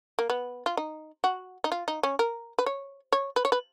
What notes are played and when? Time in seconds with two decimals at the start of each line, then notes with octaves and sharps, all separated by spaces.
0.19 A#3
0.30 B3
0.66 F4
0.77 D#4
1.24 F#4
1.64 D#4
1.72 F4
1.88 D#4
2.03 C#4
2.19 A#4
2.59 B4
2.66 C#5
3.12 C#5
3.36 B4
3.45 C#5
3.52 B4